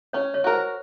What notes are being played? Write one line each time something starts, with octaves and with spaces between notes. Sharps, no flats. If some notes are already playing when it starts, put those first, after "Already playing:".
C#4 C#5
C#5
F#4 A#4
C5